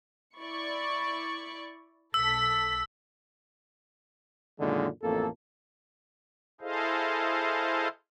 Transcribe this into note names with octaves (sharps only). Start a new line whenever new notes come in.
E4 D5 C#6
B1 A4 E6 B6
F#2 A#2 D3 D#3 G#3
A1 F2 A#3 A4
E4 G#4 A4 C5 D#5 F5